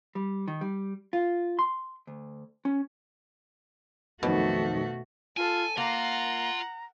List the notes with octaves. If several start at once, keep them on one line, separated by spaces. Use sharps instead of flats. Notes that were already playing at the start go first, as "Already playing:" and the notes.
G3
D#3
G3
F4
C6
D2
C#4
B1 F2 B2 D#3 A3 F#4
F4 A4 G#5
A#3 F4 F#5 A#5